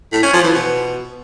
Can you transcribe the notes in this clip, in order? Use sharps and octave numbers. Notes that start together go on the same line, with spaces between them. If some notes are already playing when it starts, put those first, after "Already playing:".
A2
C#4
F3
E3
B2